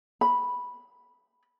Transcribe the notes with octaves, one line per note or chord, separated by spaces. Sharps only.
B5